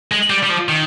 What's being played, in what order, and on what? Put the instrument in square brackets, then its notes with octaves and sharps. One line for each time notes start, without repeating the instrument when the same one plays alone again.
[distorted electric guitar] G#3
G3
G3
F3
D#3